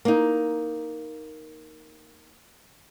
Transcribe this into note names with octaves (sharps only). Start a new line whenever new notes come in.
A#3 D#4